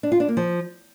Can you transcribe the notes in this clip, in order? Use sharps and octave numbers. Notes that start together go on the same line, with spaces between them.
D4
F4
D4
A#3
F3